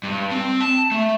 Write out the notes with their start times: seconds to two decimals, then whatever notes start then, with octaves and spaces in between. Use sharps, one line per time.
0.03 G2
0.31 C4
0.61 A5
0.91 A3